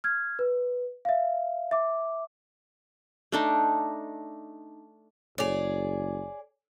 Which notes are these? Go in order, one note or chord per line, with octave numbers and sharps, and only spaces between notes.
F6 G#6
B4
E5 F5
E5 D6
A3 D4 D#4
F#1 G#4 C#5 D5 D6 F7